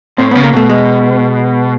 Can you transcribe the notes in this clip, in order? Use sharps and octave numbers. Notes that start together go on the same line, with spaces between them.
A2 C4
B3
C#3
A#3
B2 A3
G#3